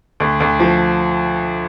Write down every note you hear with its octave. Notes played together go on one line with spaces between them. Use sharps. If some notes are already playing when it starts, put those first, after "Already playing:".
D2
D2
F3